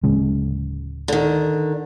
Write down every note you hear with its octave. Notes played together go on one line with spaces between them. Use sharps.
D1 C#3 G#3
D3 D#3